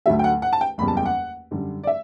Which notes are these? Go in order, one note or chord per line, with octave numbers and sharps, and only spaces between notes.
D2 D3 F#3 A3 E5
G5
F#5
F#5
A5
G5
F#1 E2 C#3 G3 B5
A5
G5
F#5
F#2 D3 G3
D5
E5